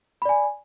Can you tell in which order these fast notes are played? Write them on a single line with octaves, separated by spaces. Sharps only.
B5 D5 G#5